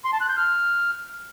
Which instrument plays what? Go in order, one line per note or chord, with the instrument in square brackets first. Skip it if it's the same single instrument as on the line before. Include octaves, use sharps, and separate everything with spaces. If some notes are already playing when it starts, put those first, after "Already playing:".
[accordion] C6
A5
F#6
G6
F6